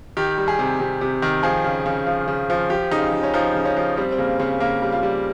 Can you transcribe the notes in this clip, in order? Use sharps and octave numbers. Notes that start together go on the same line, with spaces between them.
D#3 G4
G3
G#4
C3
C3
C3
D#3
F3 G#4
C#3
C#3
F3
C#3
F3
F3 G4
C#3 D#4
F4
C#3
C#4
F3 D#4
C#3
C#4
F3
G3 C4
C4
C#3 A#3
C#3 C4
C#3 A#3
G3
F4
G3